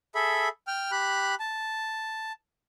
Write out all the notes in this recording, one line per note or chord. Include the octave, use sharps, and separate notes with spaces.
G#4 A4 E5 B5
G5 F6
G4 B5 F#6
A5